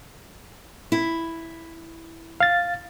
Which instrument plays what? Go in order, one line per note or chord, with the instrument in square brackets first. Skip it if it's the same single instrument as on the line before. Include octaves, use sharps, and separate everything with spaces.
[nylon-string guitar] E4
[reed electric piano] F5 A6